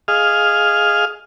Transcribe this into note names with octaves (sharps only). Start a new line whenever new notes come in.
G#4 D#5 F5 F6